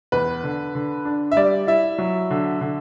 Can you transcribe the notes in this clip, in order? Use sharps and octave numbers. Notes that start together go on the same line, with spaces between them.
E2 B4
D3
D3
D4
E5
G3 D5
E4 E5
F#3
D3
D3